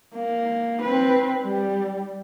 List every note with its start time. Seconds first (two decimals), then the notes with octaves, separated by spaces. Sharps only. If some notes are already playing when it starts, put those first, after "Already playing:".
0.15 A#3
0.82 C4 B4
1.44 G3